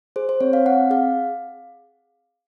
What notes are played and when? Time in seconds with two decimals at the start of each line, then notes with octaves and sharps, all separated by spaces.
0.16 G#4 C5
0.29 C5
0.41 C4 C#5
0.53 F5
0.66 C4 F#5
0.90 G#4 F5